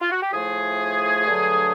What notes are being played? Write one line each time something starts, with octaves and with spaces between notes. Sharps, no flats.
F4
F#4
G4
A2 F3 A3 G#4
G2 D3 F#3 A3